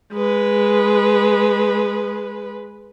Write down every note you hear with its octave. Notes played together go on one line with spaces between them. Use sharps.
G#3 B4